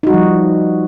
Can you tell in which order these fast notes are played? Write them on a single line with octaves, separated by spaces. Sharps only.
D#4 F#4 G3 F3